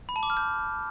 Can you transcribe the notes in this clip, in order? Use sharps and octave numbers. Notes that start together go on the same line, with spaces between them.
B5
A5
D6
F6
G6